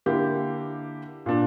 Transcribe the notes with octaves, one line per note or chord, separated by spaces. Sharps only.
D3 A#3 E4 G4
A#2 A#3 D4